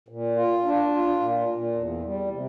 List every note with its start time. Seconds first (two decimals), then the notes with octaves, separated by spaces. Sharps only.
0.08 A#2
0.36 F4
0.65 D4
0.92 F4
1.20 A#2
1.48 A#2
1.75 E2
2.03 G3
2.31 C3